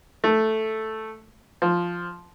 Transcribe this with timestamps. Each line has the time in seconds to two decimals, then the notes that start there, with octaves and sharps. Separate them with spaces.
0.24 A3
1.62 F3